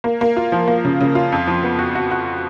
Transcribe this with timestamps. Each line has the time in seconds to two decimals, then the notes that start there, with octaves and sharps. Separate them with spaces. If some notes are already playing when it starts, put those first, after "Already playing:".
0.04 A#3
0.21 A#3
0.37 F4
0.52 F3
0.68 A#3
0.85 C#3
1.01 C#3
1.15 F4
1.32 F2
1.47 F3
1.63 B3
1.79 F#4
1.95 F#4
2.11 F#4